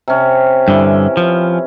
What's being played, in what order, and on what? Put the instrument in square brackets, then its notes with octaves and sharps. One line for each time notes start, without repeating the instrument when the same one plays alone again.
[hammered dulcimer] C3 C#4
[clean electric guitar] G2 D3 [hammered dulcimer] E3
[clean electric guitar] F3